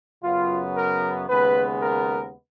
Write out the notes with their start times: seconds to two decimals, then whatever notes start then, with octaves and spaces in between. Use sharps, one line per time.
0.23 F#2 C#3 F#3 B3 F4
0.75 A#4
1.29 D#2 C#3 G#3 B3 B4
1.82 A#4